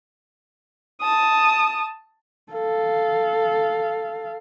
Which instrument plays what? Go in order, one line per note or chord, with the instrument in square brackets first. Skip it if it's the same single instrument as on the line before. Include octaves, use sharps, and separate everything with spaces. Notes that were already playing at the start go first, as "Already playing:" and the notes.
[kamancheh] A5 D#6
[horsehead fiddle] A4 F5